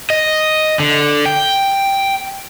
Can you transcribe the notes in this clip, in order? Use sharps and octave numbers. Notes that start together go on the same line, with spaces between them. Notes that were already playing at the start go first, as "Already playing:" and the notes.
D#5
D3
G5